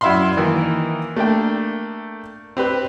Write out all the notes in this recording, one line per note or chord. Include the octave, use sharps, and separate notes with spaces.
F#2 E4 E5 F5 B5 C6
D#3 E3 A#3
A3 A#3 D4 G5
C4 G4 B4